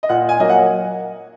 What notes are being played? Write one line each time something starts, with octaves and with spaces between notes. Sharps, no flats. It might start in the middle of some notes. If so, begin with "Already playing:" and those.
D#5
A#2 F#5
G#5
F#3 A#3 D#5
F#5